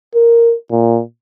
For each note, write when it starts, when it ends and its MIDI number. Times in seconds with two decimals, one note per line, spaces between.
0.15 0.54 70
0.71 1.00 46